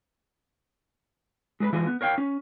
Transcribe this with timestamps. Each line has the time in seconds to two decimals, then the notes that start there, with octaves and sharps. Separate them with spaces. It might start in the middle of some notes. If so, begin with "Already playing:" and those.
1.60 G#3 G#4 A#4 B4
1.73 E3 F3 G#3 G#4
1.87 B3
2.01 A#4 C#5 F5 G5
2.18 C#4